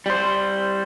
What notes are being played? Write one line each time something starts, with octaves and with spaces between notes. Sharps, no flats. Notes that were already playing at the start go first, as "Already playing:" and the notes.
G3 C5